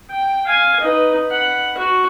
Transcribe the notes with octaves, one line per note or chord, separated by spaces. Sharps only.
G5
F5 G#5
D#4 B4
F#5 B5
F#4